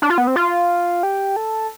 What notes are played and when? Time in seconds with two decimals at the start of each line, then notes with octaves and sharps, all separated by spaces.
0.02 D4
0.10 F4
0.18 B3
0.27 C4
0.36 F4
1.03 G4
1.36 A4